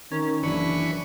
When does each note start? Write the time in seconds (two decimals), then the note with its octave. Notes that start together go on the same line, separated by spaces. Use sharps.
0.12 D#3 C#4 A#4
0.43 F#1 E3 D4 B4 C#6